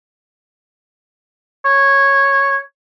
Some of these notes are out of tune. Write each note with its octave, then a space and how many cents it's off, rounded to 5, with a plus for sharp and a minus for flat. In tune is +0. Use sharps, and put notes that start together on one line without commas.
C#5 -10